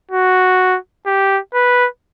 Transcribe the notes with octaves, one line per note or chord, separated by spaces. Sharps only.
F#4
G4
B4